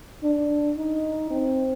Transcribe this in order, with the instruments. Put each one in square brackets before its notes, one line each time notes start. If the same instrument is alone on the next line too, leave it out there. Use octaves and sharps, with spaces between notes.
[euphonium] D4
D#4
C4